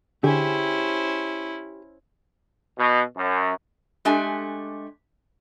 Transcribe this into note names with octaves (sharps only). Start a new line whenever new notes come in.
D3 C#4 E4 G4 G#4 C5
B2
F#2
G#3 A3 D4 G4 G#5